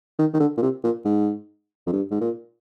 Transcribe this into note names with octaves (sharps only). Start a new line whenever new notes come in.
D#3
D#3
D3
A#2
C3
A#2
G#2
F2
G2
G#2
A#2